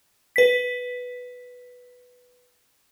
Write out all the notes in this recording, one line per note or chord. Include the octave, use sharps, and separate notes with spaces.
B4 B6